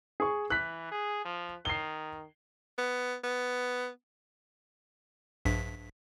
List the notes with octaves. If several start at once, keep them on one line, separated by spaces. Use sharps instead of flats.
G#4 C#6
E3 F#6 B6
G#4
F3
D#3 C7 G7
B3
B3
A#1 G2 B6